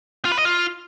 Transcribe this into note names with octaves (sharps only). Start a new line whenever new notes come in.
F4
B4
D#5
F4